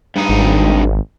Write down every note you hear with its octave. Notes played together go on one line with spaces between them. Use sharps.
G2 D#4
G#1